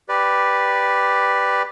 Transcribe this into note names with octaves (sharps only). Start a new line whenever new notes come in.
G4 B4 D5